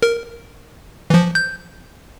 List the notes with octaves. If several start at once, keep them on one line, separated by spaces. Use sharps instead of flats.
A#4
E3 F3
G6